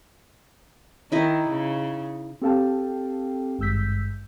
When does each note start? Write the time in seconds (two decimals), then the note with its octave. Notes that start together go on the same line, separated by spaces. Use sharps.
1.12 D#3 D#4 E4 D#5
1.49 C#3
2.41 C4 G4 A4 F5 G5 A5
3.58 G#1 G2 G#3 E6 G6 B6